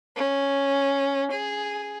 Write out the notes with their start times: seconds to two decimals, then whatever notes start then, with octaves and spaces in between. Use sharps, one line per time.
0.16 C#4
1.31 G#4